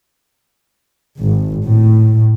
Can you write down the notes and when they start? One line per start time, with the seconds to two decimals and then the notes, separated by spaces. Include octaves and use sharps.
1.20 G#1
1.65 A2